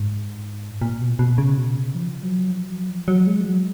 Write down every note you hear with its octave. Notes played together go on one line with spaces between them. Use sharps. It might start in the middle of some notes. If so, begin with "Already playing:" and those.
Already playing: G#2
A#2
B2
B2
C#3
B2
C#3
F3
F#3
F3
F#3
F3
F#3
G#3
F3
F#3